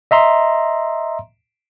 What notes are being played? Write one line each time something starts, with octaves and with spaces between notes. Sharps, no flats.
D#5 E5 A#5 C6